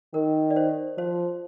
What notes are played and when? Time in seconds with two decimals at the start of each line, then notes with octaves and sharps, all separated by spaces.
0.14 D#3 A#4
0.50 D5
0.56 C5
0.97 F3 C5